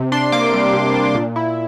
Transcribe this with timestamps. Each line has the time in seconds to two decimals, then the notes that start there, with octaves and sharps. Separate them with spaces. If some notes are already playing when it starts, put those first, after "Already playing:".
Already playing: C3
0.12 D4 C6
0.32 A#3 D6
0.53 G3
0.73 C3
0.94 D4
1.15 A#2
1.36 E4